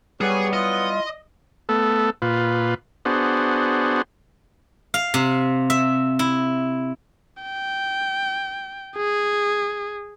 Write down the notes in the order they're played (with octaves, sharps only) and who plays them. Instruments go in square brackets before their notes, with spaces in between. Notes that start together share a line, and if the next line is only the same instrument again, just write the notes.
[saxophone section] F#3 B3 [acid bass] G3 [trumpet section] G4 C#5 [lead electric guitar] G#4
[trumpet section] E4 F4 C6 [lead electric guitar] D#5
[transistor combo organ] A3 B3 A4
A#2 F4 B4
B3 D4 F#4 G#4 C5
[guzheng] F5
C3
E5
E4
[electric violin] G5
G#4